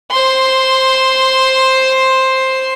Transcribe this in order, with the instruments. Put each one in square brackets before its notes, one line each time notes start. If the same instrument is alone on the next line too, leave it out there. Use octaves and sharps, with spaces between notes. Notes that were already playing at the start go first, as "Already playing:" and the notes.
[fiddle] C5 C6